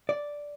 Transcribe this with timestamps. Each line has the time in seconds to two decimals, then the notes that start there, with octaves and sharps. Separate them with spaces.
0.09 D5